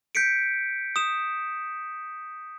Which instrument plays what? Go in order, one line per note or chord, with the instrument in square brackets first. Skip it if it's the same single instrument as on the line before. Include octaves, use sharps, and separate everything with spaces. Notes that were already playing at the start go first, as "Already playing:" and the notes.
[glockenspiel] G6 B6 C#7 D7
D#6 E7